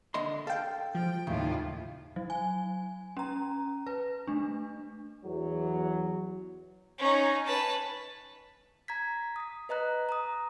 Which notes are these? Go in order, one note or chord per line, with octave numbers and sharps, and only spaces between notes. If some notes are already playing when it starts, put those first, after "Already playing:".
D3 D#5 C6
A4 F5 G5
F3 G5
D#2 A2 C#3 F4
F#3
G#5
C#4 A#5
B4
A3 D4
E2 F#3
C#4 D#4
B4 A5
A#5 G#6 B6
D#6 B6
B4 D#5 A#5 F#6
A#5 D#6